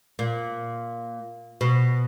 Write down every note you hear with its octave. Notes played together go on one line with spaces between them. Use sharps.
A#2
B2